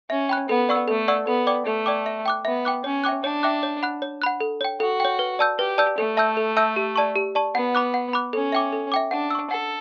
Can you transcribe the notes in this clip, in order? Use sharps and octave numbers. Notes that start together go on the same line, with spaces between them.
C#4 E5
G5 B5 F#6
B3 A4
D5 F#5 C#6 E6
A3 A4
D5 F#5 C#6 E6
B3 A4
D5 G5 D6
A3 A4
D5 G5 D6
E5
G5 D6 F#6
B3 E5
G5 D6 F#6
C#4 C#5
E5 G5 D6 F#6
D4 C#5
E5 G5 D6 F#6
C#5
F#5 B5 F#6
C#5
F#5 B5 F#6
A4
C#5 G5
F#4 A4
C#5 G5
B4
D5 A5 E6 G6
G4 B4
D5 A5 E6 G6
A3 A4
E5 A5 E6 G6
A4
E5 A5 E6 G6
G4
D5 A5 C#6
G4
D5 A5 C#6
B3 F#5
B5 D6 F#6
F#5
B5 D6 F#6
C#4 A4
E5 G5 D6
A4
E5 G5 D6
D4 F#5
C#6 E6
A4 F#5